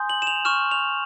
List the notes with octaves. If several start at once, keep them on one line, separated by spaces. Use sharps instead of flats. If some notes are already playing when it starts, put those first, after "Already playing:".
Already playing: G#5 C6 D#6 G6
F#7
E7
F7
C#6 F6 E7
F7